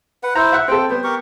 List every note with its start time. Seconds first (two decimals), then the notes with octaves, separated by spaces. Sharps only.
0.23 B4 F#5
0.35 E4 C5 A#5
0.53 E5 F#5
0.68 C4 F4 A4 G5
0.90 G3 B3 C5
1.04 G4 A#4 C#6